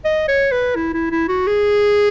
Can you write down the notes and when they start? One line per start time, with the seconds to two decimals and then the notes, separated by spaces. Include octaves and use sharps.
0.05 D#5
0.28 C#5
0.52 B4
0.75 E4
0.94 E4
1.11 E4
1.28 F#4
1.47 G#4